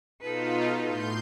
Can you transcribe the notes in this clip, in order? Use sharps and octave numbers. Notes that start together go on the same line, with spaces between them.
B2 D#4 F4 A4 B4
A2 C6 G6